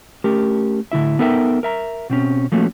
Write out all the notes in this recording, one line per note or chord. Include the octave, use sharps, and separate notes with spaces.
A3 C#4 G4 A#4
A2 D3 E4 E5
B3 D#4 A4 A#4 E5 G5
A#4 E5 A#5
B2 C4 C#4
F3 A3 A#3 C#4 F#4